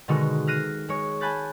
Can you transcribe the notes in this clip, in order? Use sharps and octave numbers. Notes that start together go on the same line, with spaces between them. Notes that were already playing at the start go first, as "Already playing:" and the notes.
B2 D3 D#3 G#3 D#4 F#4
F6 F#6 A#6 C7 D#7
G#3 C#5
G#5 A5 B5 F#6 G6 A6